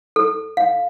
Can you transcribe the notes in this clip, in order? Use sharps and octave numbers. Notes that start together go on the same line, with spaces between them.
A4
F5